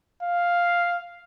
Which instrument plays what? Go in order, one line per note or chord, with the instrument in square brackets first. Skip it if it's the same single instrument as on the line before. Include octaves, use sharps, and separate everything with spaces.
[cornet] F5